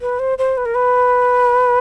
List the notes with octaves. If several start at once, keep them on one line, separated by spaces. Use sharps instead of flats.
B4
C5
C5
B4
A#4
B4